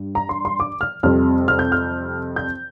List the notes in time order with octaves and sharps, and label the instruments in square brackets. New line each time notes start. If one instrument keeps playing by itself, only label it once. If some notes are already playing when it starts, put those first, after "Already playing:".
Already playing: [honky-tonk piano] G2
A#5
C6
C6
D6
F6
F2 C3 G3 C4 F6
F6
G6
F6
G6